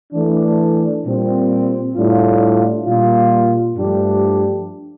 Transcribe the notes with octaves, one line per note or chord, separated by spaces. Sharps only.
E3 A3 D4
A#2 G3 C4
A2 G3 D4 F4
A#2 G3 A#3 F4
G2 F3 A3 D4 G4